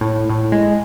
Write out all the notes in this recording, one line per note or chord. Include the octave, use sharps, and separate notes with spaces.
A2
A2
G#3